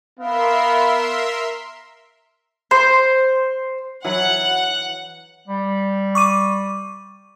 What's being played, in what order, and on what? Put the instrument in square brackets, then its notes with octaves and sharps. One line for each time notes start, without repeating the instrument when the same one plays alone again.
[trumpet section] B3 F5 [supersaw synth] A#4 E5 C6
[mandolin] C5
[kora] E3 F#3 B4 [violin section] F#5 F#6
[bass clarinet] G3
[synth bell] C#6 D6 D#7